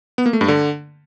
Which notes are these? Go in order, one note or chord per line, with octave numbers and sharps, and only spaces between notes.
B3
A#3
A3
G2
D3